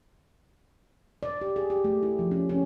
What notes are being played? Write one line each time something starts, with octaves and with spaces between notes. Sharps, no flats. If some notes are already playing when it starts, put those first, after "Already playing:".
D5
G4
G#4
G4
A3
E4
F3
C#4
C#4